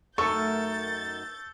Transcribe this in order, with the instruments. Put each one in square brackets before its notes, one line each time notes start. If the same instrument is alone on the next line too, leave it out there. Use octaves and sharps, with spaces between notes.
[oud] F#2 D#3 A3 [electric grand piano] A4 [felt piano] C#6 [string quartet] G6 A6